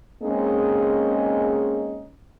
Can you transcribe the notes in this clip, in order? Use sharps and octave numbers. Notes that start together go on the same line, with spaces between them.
G#3 A#3 C4 C#4 D#4 G#4